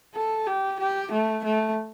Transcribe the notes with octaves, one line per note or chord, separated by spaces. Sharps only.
A4
G4
G4
A3
A3